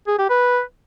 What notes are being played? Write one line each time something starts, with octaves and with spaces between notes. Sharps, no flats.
G#4
G4
B4